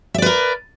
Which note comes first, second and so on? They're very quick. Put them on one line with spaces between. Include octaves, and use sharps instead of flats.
E5 D5 B4 A#4